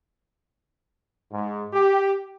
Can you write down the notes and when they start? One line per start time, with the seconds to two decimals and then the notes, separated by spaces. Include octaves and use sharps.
1.32 G#2
1.73 G4